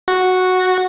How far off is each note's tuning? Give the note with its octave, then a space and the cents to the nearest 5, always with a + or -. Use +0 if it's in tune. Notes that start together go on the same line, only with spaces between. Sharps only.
F#4 -5